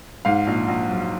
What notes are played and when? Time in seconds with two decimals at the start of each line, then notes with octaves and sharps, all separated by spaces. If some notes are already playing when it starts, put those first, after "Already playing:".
0.25 G#2 F5
0.47 A#1
0.68 A#1
0.89 F#3